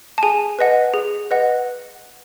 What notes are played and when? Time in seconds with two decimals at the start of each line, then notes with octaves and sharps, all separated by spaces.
0.18 A5
0.23 G#4 G#5
0.59 B4 D#5 F#5
0.94 G#4
1.31 B4 D#5 F#5